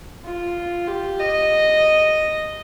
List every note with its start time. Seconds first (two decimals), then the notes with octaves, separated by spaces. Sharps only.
0.25 F4
0.87 G4
1.19 D#5